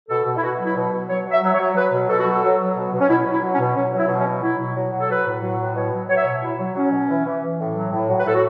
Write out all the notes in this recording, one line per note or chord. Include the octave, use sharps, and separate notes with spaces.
B2 A4
B2
E4
B2 F#4
F#3
E4
B2
B2
F#3 C#5
F#3
E5
F#3
C#5
F#3
F#3 B4
B2
B2 A4
F#4
F#3 A4
F#3
F#3
B2
B2
C#4
B2 E4
F#3
E4
F#3
C#4
B2
F#3 C#4
F#3
E4
B2
C#4
F#3
F#3 E4
B2
F#3
F#3
A4
F#3 B4
A2
F#3
A2
B2 C#5
F#3
F#3 C#5
E5
C#5
B2
F#3 E4
F#3
F#3 C#4
B2
E3
E3
E3
A2
F#3
A2
F#3
B4
A2 A4
F#4